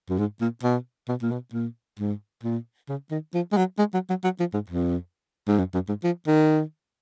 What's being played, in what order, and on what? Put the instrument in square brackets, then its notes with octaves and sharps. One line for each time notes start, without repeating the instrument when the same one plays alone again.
[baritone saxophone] F#2
G#2
A#2
B2
B2
A#2
B2
A#2
G#2
A#2
C#3
D#3
F3
G#3
F#3
G#3
F#3
F#3
F#3
F3
G#2
F2
G#2
F#2
F#2
G#2
F3
D#3